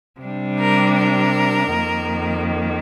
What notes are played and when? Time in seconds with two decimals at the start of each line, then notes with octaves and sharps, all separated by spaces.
0.19 C3 G3 D4
0.58 A#4
0.98 A#4
1.75 F2 D#3 A#3